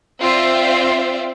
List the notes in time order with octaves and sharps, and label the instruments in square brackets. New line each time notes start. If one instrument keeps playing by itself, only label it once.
[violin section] C4 F4 C5 D5 E5